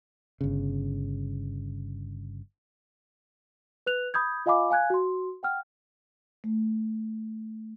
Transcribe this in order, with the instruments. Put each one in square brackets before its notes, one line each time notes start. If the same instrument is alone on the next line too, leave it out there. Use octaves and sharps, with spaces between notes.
[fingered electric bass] G1 C#3
[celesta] B4 F#6 F7
B5 D#6 G6 G#6
F4 D#5 F5 G#5 B5 D6
F5 G#5 F#6 G#6
F#4 C6
F#5 G5 F6
[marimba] A3